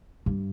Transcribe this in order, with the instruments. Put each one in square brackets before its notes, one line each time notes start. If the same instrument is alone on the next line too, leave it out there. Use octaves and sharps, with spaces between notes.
[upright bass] G2